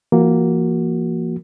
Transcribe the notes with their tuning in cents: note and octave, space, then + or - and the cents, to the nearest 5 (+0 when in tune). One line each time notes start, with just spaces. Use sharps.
F3 -45 A#3 +0 F#4 +0